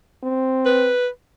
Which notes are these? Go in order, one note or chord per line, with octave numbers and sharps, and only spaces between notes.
C4
B4